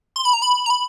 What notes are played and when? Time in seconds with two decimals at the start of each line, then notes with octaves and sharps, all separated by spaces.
0.16 C6
0.25 B5
0.33 A#5
0.42 B5
0.66 A#5
0.70 B5